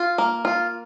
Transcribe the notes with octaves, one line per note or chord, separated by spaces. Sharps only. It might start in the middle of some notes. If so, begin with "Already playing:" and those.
Already playing: F4
A#3
F4